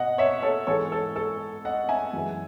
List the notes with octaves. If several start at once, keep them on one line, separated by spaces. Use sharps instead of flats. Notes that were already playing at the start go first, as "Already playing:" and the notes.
Already playing: B2 D#5 F#5
C#5 E5
A4 C#5
G#2 E3 G#3 A4 C#5
A4
A4
D#5 F#5
E5 G#5
F#2 E3 G#3